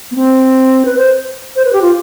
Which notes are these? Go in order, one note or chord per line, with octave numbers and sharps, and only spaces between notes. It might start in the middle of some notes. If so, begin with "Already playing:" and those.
B3
C4
B4
C5
C5
B4
G4
F4